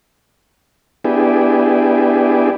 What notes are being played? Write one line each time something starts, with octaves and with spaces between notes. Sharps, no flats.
B3 D4 E4 G4 G#4